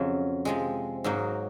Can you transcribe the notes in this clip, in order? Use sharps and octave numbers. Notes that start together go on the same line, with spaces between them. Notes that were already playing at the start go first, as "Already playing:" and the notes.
Already playing: F2 C#3 F#3
C3 F3 G#3
G#2 F#3 A#3 D#4 F#4